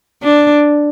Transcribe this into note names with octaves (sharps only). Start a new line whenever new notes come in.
D4